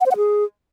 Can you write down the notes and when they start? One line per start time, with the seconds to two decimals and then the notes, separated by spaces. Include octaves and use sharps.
0.01 F#5
0.06 C5
0.11 F#5
0.17 G#4